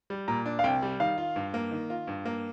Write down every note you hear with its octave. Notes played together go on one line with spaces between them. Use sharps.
G3
A#2 A#5
D4
F5
C2 G5
G3
D#3 F5
F4
G2
A#3
D#3
F4
G2
A#3